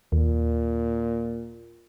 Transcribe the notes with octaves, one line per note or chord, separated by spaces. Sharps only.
D#2 A#2